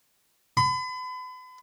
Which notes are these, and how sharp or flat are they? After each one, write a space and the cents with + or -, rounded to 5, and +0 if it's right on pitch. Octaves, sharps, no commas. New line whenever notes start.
B5 +40